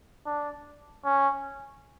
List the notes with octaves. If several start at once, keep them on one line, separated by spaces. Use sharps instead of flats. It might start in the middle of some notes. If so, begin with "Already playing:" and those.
D4
C#4